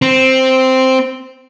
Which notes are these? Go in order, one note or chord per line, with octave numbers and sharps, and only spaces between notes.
C4